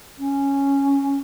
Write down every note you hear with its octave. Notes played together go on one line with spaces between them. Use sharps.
C#4